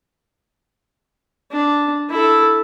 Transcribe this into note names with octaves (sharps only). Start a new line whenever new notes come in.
D4
E4 A4